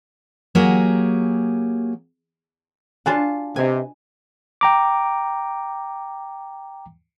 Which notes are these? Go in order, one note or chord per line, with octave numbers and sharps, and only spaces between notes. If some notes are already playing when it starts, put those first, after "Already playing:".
F#3 A#3 G4 G#4
D4 F4 F#4 F5 G#5 A5
C3 B4 D#5 G#5
G5 A#5 D6